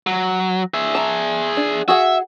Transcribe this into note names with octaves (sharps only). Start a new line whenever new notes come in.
F#3
G#4 E5
A5 A#5
D4
F#4 G#4 E5 F#5